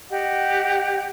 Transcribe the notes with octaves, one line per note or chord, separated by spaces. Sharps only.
G4 D#5 F#5